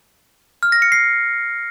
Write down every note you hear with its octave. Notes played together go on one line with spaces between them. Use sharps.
F6
A#6
C#7
C7